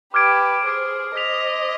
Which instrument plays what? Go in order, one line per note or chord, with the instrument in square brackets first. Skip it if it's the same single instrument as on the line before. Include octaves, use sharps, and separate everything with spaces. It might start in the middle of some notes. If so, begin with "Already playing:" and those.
[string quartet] G4 B4 [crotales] D6 F6 G#6 D7
[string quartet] G#4 C5 [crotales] D6 F6 G#6 D7
[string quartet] C5 D#5 [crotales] F6 B6 F7